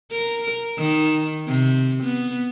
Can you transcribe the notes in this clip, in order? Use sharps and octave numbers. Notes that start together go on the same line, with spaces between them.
A#4
D#3
C3
B3